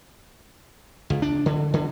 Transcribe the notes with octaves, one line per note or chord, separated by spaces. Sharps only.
C#2
D4
D3
D3